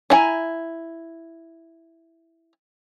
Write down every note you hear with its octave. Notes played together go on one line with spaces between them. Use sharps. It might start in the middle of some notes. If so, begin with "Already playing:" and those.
D4 E4 G#5 A#5